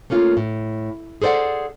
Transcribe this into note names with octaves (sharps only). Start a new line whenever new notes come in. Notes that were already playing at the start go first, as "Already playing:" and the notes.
A3 A#3 C#4 F4
A2
G#4 A4 C5 D5 F#5